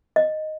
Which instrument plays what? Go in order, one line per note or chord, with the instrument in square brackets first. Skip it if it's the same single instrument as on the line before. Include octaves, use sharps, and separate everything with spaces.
[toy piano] D#5